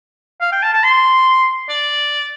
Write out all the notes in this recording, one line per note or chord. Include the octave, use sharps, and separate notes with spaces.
F5
G5
A5
A5
C6
D5